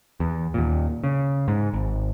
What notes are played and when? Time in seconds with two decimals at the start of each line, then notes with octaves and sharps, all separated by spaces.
0.20 E2
0.54 D#2 A#2
1.04 C#3
1.48 G#2
1.73 G#1